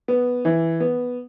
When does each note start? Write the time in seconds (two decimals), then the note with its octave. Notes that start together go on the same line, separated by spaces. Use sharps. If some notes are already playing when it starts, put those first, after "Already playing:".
0.08 B3
0.45 E3
0.80 B3